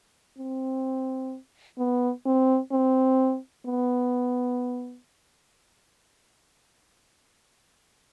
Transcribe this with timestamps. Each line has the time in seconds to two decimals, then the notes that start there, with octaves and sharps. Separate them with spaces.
0.38 C4
1.78 B3
2.26 C4
2.72 C4
3.66 B3